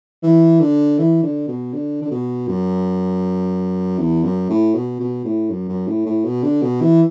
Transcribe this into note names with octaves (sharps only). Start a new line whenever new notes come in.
E3
D3
E3
D3
B2
D3
D3
B2
F#2
E2
F#2
A2
B2
B2
A2
F#2
F#2
A2
A2
B2
D3
B2
E3